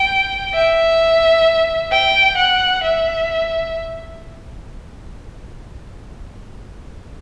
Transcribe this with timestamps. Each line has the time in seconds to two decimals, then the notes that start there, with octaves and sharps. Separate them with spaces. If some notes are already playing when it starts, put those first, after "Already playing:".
Already playing: G5
0.54 E5
1.92 G5
2.37 F#5
2.83 E5